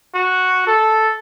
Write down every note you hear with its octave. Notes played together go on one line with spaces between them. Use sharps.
F#4
A4